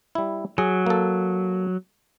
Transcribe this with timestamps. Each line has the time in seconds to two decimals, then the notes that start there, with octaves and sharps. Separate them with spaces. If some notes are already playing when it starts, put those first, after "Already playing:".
0.15 G3 E4
0.58 F#3 G#4
0.86 A#3 A4